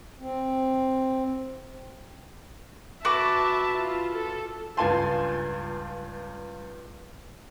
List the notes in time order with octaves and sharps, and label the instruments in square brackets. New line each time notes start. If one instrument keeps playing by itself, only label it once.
[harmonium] C4
[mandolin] F#4 B4 D6 [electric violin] E5 A5
[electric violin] F4
A4
[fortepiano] C#2 G2 F4 G#5 A5 C6